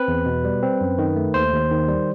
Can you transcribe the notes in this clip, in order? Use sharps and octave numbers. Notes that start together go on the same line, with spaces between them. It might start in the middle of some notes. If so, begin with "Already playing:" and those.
Already playing: C4 B4
E2
B2
G3
C4
F#2
D#3
A3
D#2 C5
D#2
D#3
G3